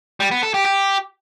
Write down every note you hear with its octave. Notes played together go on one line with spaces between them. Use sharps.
G3
B3
A4
G4
G4